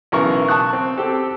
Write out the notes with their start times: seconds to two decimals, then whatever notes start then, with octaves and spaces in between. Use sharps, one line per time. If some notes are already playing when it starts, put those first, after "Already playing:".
0.12 B1 C#3 E3 A#4 C#6
0.48 A5 C#6 D#6 F#6
0.73 C4
0.97 C4 G4 A4